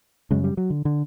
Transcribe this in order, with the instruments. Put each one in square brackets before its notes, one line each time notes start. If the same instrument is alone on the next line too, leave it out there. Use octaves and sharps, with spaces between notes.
[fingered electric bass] F#2 C#3 G#3
G3
F#3
D3
D3